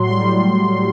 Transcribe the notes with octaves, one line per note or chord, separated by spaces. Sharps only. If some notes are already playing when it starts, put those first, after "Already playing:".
Already playing: A2 F#3 C6
G3
A2